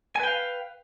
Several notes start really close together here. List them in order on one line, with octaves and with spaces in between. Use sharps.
G#5 B4 G5 F5